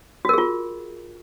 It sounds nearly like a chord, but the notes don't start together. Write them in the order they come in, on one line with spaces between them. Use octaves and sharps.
F#4 A#4 G#4 F4